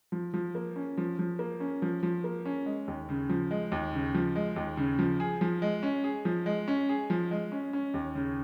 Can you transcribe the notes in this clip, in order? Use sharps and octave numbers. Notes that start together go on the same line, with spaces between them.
F3
F3
A#3
C#4
F3
F3
A#3
C#4
F3
F3
A#3
C#4
G#3
D#2
C#3
F3
G#3
D#2
C#3
F3
G#3
D#2
C#3
F3
G#4
F3
G#3
C#4
G#4
F3
G#3
C#4
G#4
F3
G#3
C#4
C#4
D#2
C#3